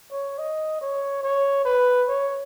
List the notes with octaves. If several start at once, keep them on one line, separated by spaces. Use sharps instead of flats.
C#5
D#5
C#5
C#5
B4
C#5